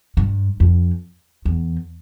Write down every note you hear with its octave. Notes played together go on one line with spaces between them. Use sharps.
G2
F2
E2